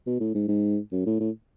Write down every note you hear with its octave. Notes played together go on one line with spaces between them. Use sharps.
B2
A2
G#2
G#2
F#2
A2
A2